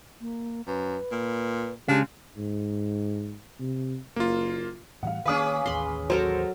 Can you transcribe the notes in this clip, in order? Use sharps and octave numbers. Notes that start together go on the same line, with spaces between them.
A#3
F#2 B4
A#2
C#3 G#3 D4 G4
G#2
C3
F#1 A#3 F4
A2 E3 G3 F5 F#5
D#3 A#3 C#4 G#4 B4 F5 D6
A1 D#2 B5 C6
F#3 A4 A#4 C5